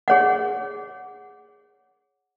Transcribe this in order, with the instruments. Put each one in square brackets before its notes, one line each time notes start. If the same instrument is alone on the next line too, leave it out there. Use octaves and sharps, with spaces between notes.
[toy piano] G#4 C#5 F#5